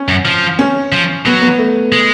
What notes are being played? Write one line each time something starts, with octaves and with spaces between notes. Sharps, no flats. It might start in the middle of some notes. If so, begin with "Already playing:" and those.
Already playing: C#4
F#2
F3
C#4
F3
F#3 B3
B3
A3
G#3